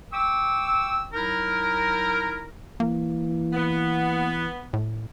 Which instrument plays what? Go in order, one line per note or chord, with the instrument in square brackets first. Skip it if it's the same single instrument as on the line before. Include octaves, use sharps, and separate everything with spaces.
[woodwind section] G5 C#6 D6 E6
F#3 D#4 E4 A#4
[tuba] E3 [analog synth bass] A#3
[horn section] B3
[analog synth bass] A2